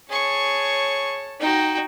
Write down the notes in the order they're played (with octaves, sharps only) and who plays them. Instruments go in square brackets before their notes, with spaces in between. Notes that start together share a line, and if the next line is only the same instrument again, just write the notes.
[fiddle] G#4 C#6 [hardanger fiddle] C#5 A5
[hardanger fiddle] D#4 [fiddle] F#4 G5